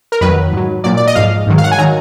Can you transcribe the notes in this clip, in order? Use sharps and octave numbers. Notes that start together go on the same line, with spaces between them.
A#4
F2 D#3 F#3 B4
G#2 F#3
A#2 F#3 D5
D5
D#5
G#2 F3 F5
G#2 D#3 F#3
F5
F#5
G#5
D#3 F#3 A#5